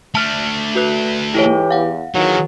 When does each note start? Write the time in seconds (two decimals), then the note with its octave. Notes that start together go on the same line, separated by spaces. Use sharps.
0.15 A3 D4 A5 F6
0.75 F#4 B4 F#6
1.35 G#2 E3 E4 G4 A4 C#5
1.71 E2 F5 F#5
2.15 D#2 D#3 E3 F#3 G#4